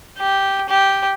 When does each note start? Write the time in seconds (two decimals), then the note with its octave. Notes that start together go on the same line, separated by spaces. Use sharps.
0.18 G4
0.69 G4